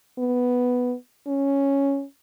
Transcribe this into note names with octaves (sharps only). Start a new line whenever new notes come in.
B3
C#4